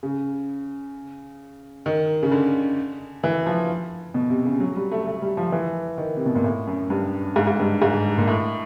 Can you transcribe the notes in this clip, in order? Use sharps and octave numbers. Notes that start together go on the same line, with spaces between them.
C#3
D#3
C#3
D3
E3
F3
B2
C3
C#3
F#3
G3
A3
A3
G3
F3
E3
D#3
C3
B2
A#2
A2
F#2
G2
G#2
G#2
G2
G#2
A#2
A2